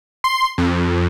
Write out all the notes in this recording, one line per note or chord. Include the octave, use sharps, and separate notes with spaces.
C6
F2